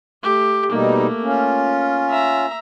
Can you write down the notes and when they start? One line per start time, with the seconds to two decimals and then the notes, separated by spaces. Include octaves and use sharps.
0.23 A3 G4
0.71 B2 G3 A3 A#3 D#4
1.22 C#4 F4
2.10 E5 A#5